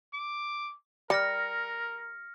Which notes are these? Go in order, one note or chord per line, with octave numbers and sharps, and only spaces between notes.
D6
G3 A#4 F6 A#6 C#7